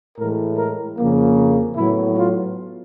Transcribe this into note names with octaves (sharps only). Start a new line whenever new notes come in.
A2 E3 G#3 A#4
A#4
F2 C#3 F3 A#3
A2 F#3 B3 E4
F4